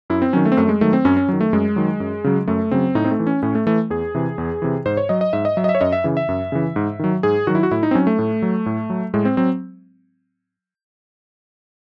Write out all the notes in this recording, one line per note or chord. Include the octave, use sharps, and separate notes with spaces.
F#2 E4
C4
D#3 F#3 C#4
A3
C4
F#2 A3
G#3
D#3 F#3 A3
C4
F#2 C#4
C#4
D#3 F#3
A3
F#2 G#3
D#3 F#3
F#2
C#3 F#3
F#2 A3
C#3 F#3 C4
A2 D#4
C4
A3
E3
C#4
A2 C#4
A3
E3 A3
E2 G#4
C3 E3
E2
C3 E3
G#2 C5
C#5
F#3 D#5
D#5
G#2 E5
D#5
F#3 E5
D#5
E5
C#5
F#2 D#5
E5
C#3 E3
E5
F#2
C#3 E3
G#2
D#3 F#3
G#2 G#4
D#3 F#3 F#4
E4
F#4
A2 E4
D#4
C4
F#3 C#4
A3
A2
F#3
A2
F#3
A2 G#3
C4
F#3 C4